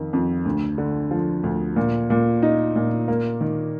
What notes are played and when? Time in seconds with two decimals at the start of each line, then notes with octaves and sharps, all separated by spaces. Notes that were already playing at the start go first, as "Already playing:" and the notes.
Already playing: F2 D#3
0.13 F2
0.45 D2
0.78 D3
1.11 F3
1.43 D2
1.76 A#2
2.10 A#2
2.43 D#4
2.76 A#2
3.08 A#3
3.41 D#3